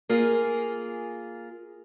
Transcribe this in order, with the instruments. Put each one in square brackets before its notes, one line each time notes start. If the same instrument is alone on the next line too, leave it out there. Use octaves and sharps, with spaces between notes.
[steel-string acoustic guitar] A#3 F4 G#4